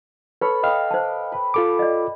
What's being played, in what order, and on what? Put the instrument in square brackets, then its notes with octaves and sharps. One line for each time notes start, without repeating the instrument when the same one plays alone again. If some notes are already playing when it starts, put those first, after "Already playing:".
[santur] A4 C#5 B5 [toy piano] B4
[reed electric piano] D#5 F5 F6 [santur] G5 D6 D#6
[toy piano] C5 A5
[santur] B4
[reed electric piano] F4 A4 D6
[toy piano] D5 D#5